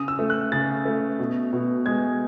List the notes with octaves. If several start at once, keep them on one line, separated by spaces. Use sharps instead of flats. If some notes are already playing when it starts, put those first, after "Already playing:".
Already playing: C#3 D#6
E6
A3
F#6
C#3 A6
A3
B2
B2
G#3 G#6